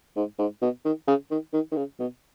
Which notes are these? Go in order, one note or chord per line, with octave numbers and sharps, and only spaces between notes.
G#2
G#2
B2
D#3
C#3
D#3
D#3
D#3
C#3
B2